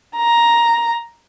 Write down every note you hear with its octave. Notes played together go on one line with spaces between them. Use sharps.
A#5